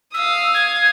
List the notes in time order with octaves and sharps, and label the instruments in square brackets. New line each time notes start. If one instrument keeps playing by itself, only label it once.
[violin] F5 D#6 [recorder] E6
[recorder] G#6